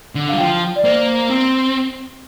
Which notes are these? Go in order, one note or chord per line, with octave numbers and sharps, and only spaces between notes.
D3
G3 F5
F3 G5
D5
A#3 C5
C4